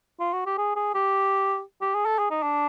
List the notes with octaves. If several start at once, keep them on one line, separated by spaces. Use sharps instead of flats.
F4
F#4
G4
G#4
G#4
G4
G4
G#4
A4
G#4
D#4
D4